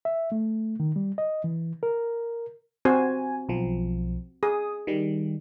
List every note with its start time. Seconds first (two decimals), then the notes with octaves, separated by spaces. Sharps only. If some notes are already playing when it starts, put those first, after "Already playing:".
0.05 E5
0.32 A3
0.80 D#3
0.96 G3
1.18 D#5
1.44 E3
1.83 A#4
2.85 C4 F#4 C5 G#5
3.49 B1 F3
4.43 G#4 D#6
4.87 D#3 G3